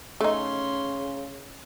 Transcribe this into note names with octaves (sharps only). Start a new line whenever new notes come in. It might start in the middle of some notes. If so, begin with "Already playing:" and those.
C#3 A3 C#4 D#4 C6